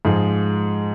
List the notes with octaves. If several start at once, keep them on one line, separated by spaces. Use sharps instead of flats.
G#2 F3 G#3